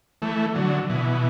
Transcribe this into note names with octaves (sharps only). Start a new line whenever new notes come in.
E3 A3
D3 F#3
B2 E3